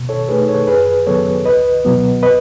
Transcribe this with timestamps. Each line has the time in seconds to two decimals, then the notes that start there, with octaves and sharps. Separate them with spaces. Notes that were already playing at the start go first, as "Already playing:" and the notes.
Already playing: B2
0.09 A4 C#5
0.29 A3 D#4 G#4 B4
0.48 A4 C#5
0.67 F#2 G#4 B4
1.07 C#3 F#3 B3 A4 C#5
1.46 C#2 B4 D#5
1.85 B2 F#3 B3
2.23 B4 D#5